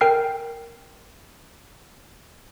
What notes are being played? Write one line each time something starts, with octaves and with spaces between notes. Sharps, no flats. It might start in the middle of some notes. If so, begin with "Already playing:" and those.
A#4 G5 F6 C7